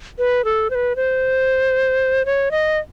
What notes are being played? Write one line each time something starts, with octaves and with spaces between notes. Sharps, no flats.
B4
A4
C5
B4
C5
C#5
D#5